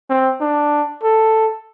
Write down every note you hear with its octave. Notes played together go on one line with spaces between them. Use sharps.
C4
D4
A4